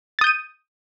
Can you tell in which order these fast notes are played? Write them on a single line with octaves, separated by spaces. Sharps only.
A6 D#6 G6 D#7